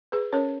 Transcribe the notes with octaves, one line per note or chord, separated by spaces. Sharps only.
G#4 B4
C#4 A#4 C#5